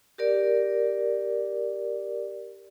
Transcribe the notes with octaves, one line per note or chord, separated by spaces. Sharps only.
G4 A#4 D5